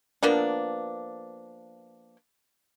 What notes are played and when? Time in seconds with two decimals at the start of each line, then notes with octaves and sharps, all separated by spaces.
0.23 F3 A#3 B3 D4